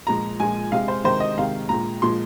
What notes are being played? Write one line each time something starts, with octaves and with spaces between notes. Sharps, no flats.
A#2 F3 G#3 A#5
A#2 F3 G#3 G#5
C3 G#3 F5
C5
C3 D#3 G#3 C5
D#5
C3 D#3 G#3 F5
A#2 G#3 A#5
A#2 F3 G#3 C6